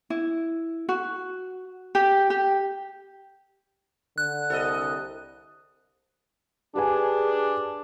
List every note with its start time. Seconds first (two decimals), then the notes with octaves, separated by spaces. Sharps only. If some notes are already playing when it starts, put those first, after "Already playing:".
0.10 E4
0.89 F#4
1.95 G4
2.30 G4
4.18 D3 F#6
4.50 C2 A4 D#5
6.76 D4 G4 G#4 B4 G#5